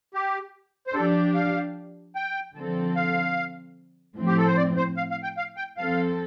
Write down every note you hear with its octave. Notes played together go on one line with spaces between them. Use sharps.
G4
C5
F3 D4 G4 A4
F5
G5
D3 F3 C4 A4
F5
A2 F3 C4
G4
A4
C5
D5
C5
F5
F5
G5
F5
G5
F3 C4 A4 F5